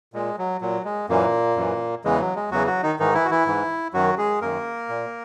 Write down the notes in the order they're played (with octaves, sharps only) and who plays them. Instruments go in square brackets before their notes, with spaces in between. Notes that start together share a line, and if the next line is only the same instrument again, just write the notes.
[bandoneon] A#2 G#3
F#3
A#2 F#3
G#3
F#2 A#2 E3 A#3
F#2 E3
E2 C#3 E3 G#3
F#3
G#3
E2 C#3 E3 F#3 F#4
F#3 F#4
D#3 D#4
G#2 D#3 E3 D#4
E3 E4
F#4
E3 E4
G#2 E3
F#2 D#3 F#3 F#4
G#3 G#4
F#2 D#3 A#3 A#4
A#2